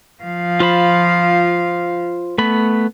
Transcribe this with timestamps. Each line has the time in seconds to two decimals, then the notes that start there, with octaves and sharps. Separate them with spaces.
0.23 F3 F5
0.60 F4 C5 B5
2.38 A3 B3 B5